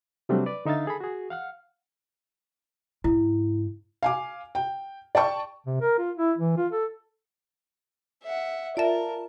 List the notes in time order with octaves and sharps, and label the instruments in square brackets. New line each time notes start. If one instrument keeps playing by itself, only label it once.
[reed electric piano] C3 F#3 G3 A3 C4 D4
B4 D5
D3 D#4 E5 F5 A6
G#4 A4 B5
F#4 G#4
F5 F#5 F6
[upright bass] G#2 C#3 [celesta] E4
[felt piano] F5 G#5 D6
G5
D5 G5 A5 C#6
[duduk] C3
A#4
F4
E4
E3
F4
A4
[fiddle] E5 F#5
[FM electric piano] F4 A5 [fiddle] A#4 [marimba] D5 E5